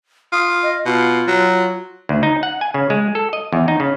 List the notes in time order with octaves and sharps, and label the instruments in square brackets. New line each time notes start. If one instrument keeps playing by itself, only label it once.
[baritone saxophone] F4 [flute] D#6
[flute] D#5
[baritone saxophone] B2 [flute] F4
[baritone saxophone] F#3
[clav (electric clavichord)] D2
D#4
F#5
G#5
C#3
G#3
A4
D#5
E2
D#4
C#3